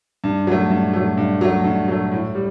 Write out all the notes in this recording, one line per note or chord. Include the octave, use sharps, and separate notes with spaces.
G2
F#3 A3
G2
F#3 A3
G2
F#3 A3
G2
F#3 A3
A2
G3